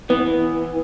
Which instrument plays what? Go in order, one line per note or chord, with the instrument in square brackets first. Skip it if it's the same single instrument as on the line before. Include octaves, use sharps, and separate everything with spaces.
[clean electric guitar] E3 [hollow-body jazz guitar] B3